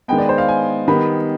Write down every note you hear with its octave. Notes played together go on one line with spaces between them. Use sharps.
D#3 G#3 B3 G5
D5
C5
F5
G#5
D#3 G3 B3 B5